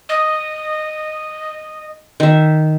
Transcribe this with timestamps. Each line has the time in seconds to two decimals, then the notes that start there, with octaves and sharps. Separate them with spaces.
0.09 D#5
2.20 D#3 E5